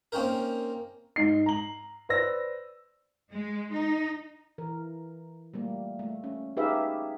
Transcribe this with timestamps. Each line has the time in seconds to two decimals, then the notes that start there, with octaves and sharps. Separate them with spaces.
0.12 A#3 C4 C#4 D#4 A#4
1.16 G#2 D#4 C7
1.46 A#5 F#7
2.09 B4 C5 D5 E6 A#6
3.31 G#3
3.71 D#4
4.58 E3 A#4
5.54 G3 A3 A#3
5.99 A3
6.24 C#4
6.57 D#4 G4 G#4 B4 E5 F5